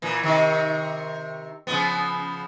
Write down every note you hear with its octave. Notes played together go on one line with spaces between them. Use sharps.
A#2 E3
C3 D#3
C#3 F3 B3